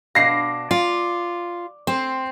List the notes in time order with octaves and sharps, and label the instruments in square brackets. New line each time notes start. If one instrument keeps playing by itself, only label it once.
[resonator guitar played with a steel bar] B2 D4 F5 [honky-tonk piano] A#6 C7
[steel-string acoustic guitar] F4 [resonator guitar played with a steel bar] D5
[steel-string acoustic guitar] C4 [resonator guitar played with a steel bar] C5